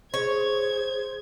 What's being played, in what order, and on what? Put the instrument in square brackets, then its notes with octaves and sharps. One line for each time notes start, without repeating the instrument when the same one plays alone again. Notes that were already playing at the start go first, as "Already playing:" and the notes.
[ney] G#4 [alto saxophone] C5 [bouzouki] C#5 [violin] G#6